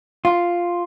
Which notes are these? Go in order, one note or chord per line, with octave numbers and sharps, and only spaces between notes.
F4